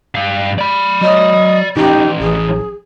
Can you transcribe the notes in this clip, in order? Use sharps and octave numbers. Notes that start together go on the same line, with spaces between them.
G2 F5
D5 B5
F#3 D#5
E3 C#4 D#4 G4
A1 G#4